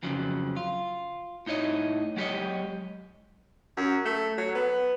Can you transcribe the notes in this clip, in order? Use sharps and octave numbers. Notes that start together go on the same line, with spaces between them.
F2 C#3 F3 F#3
F4
A2 D#4 E4 C#5 D#5
F#3 G#3 G4 A#4 C#5 D#5
F#2
A3
F#3
B3